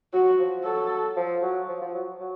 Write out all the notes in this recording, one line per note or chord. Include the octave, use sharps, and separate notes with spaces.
F#3 F#4
F3
F#3 A4
F3
F#3
F3
F3
F#3
F#3